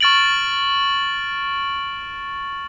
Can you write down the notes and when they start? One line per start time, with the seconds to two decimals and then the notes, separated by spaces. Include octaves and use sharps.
0.01 C#6 F6 A6 D7 F#7